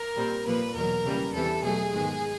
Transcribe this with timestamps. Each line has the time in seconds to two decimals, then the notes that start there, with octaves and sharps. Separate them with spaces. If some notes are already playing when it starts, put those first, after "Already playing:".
Already playing: A#4
0.16 A#2 G3 C4
0.46 A#2 F3 A#3 B4
0.75 E2 B2 F#3 A#4
1.05 C#3 E3 G3 A#3
1.33 E2 C3 E3 G3 A4
1.62 B2 F#3 A3 G#4
1.91 G#2 D#3 G#3 B3